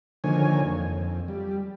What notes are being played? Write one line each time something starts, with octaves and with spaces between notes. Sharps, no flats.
D3 D#3 F3 A#3 C#5 G#5
F2
G3